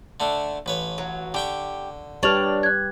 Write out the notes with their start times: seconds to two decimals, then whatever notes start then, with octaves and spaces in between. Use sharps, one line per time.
0.20 D3 A3 D4
0.66 A1 B4 C#5
0.98 F#3
1.34 D3 G4 G5 C#6
2.23 G3 D4 G4 B4 C#5 F6 F7 F#7
2.63 F#6 G#6